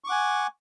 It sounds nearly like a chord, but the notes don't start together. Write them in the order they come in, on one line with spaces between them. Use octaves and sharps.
C#6 D6 F#5 G#5